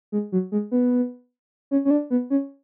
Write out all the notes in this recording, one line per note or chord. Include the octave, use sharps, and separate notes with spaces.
G#3
F#3
G#3
B3
C#4
C#4
D4
B3
C#4